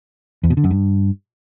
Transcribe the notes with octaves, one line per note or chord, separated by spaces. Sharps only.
E2
B2
D3
F#2
G2